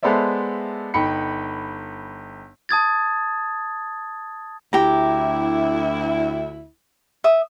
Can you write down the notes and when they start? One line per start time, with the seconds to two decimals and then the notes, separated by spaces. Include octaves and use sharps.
0.03 G#3 B3 A4 C5 D5 E5
0.94 G1 D#4 G5 B5 C#7
2.69 A5 D#6 G#6 A6
4.73 D2 E4 G4 A#5
7.24 E5 D#6